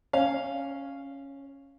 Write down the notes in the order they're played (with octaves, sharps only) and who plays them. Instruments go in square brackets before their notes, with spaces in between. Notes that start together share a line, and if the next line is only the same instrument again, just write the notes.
[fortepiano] C#4 F5